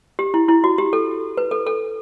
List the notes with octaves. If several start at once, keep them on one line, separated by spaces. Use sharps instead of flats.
G4
E4
E4
F#4
G4
A4
B4
A4
A4